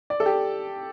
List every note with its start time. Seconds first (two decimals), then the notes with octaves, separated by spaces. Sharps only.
0.10 D5
0.20 A4
0.26 G4